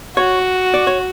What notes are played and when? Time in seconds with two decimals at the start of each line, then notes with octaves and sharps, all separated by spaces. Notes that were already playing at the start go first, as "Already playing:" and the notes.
0.17 F#4 C#5
0.74 D5
0.87 C#5